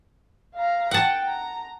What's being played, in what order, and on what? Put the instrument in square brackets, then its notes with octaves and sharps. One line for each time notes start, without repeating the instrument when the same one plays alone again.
[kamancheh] F5 A#5
[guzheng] F#5 A5 [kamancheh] G5
[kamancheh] A#5